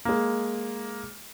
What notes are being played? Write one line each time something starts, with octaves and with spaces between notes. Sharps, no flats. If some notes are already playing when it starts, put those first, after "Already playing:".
G#3 A#3